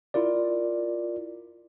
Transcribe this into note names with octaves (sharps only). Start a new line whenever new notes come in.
E4 F4 A#4 D5